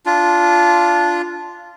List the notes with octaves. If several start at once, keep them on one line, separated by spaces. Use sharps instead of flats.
D4 F4